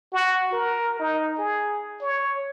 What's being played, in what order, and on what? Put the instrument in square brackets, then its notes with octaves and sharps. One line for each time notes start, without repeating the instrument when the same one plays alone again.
[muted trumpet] F#4
A#4
D#4
G#4
C#5